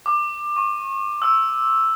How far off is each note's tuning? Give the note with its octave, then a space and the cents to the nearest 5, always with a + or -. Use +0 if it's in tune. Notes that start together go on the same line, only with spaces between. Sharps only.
D6 +20
C#6 -35
E6 +0